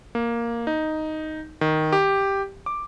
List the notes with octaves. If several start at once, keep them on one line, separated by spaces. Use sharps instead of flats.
A#3
D#4
D#3
G4
D6